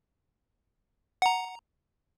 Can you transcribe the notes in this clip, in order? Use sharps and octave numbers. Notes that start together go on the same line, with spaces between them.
F#5 A#5